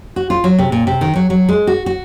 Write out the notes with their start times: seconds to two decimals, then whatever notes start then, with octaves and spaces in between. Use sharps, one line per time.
0.16 F#4
0.30 F4
0.44 F#3
0.59 C3
0.72 A#2
0.87 C3
1.01 D#3
1.16 F#3
1.30 F#3
1.49 G#3
1.67 F#4
1.86 F#4